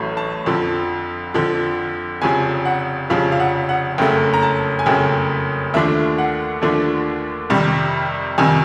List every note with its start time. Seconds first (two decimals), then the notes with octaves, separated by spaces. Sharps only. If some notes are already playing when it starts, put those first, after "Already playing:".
Already playing: A1 A2 F#3 A3
0.17 A5
0.46 F2 D3 F3
1.34 F2 D3 F3
2.22 F1 F2 C#3 F3 G#5
2.65 F#5
3.10 F1 F2 C#3 F3 F5
3.32 F5
3.40 F#5
3.69 F#5
3.98 F#1 F2 C#3 F#3 A3 G5
4.34 A#5
4.43 A5
4.79 G#5
4.86 F#1 F2 C#3 F#3 A3 G5
5.74 D#2 D3 F3 A3 D4 E5
6.18 F#5
6.61 D#2 D3 F3 A3 D4
7.50 F2 C3 D#3 G3
8.38 F2 C3 D#3 G3 G#5